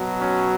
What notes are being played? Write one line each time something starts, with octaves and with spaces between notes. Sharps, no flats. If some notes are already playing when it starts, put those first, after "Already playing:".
Already playing: B2 F#3
C#4